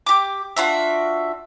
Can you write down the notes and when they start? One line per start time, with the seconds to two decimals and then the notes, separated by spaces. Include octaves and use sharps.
0.06 G4 D6
0.57 D4 F4 F#4 E5